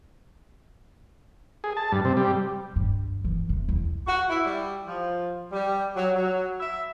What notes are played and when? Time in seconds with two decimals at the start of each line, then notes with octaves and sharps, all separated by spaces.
1.64 G#4
1.77 A5
1.92 G2
2.05 C3
2.17 G3
2.76 G2
3.24 E3
3.49 C3
3.68 E2
4.07 F#4
4.30 E4
4.45 G3
4.88 F3
5.52 G3
5.96 F#3
6.16 F#3
6.59 E5